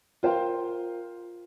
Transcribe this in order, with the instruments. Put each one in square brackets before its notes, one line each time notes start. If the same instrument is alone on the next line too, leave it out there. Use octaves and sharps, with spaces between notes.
[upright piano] F4 A#4 C5 F5 G5